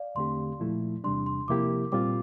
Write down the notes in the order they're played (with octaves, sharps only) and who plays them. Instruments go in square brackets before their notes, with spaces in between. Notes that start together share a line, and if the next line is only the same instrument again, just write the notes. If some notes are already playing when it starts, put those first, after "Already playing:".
Already playing: [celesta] D5 F5
[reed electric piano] E2 D3 A3 C4 G4 [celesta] C6
[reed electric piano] A#2 F3 A3 E4
[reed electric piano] E2 C3 G3 D4 [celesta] C6
[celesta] C6
[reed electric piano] C3 F3 A#3 E4 G4 [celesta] D6
[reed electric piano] A#2 G3 C4 F4 [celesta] D6